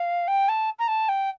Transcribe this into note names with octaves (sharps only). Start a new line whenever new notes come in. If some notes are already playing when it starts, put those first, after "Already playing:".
Already playing: F5
G5
A5
A#5
A5
G5